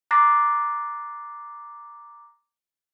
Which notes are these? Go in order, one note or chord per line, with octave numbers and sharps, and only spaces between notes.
A#5 D6 F#6 A6 A#6 C7